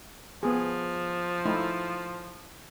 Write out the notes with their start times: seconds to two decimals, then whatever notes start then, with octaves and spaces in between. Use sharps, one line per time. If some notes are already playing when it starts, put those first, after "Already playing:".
0.43 F3 B3 G#4
1.46 A3 D#4 E4